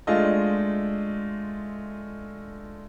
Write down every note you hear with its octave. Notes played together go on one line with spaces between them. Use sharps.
G#3 A3 D4 F4 D#5